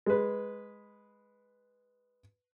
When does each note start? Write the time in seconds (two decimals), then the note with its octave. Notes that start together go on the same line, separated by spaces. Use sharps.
0.06 G#3 B4